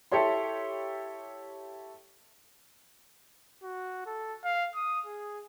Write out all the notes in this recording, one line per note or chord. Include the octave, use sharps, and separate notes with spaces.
E4 G4 A4 C#5 C6
F#4
A4
F5
D#6
G#4